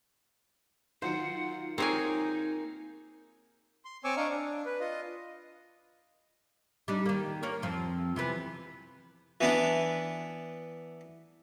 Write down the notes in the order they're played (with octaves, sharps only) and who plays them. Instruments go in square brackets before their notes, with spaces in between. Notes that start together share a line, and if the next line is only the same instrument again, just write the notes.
[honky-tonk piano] D#3 F#3 F4 [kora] C5 [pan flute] F#5
[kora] A#3 G#4 A#4 [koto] C4 C#5 G#5 [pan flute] D#4
[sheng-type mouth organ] C6
C4 C#5 G#5 C#6 D6 E6
D4 D#5 F5 A#5 C#6
D4
B4
F4 D#5
[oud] G3 D4 D#4
D#3 A#3
A#3 A#4 C#5
F2 F3 C4
C3 E3 B3
[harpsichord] E3 B3 D4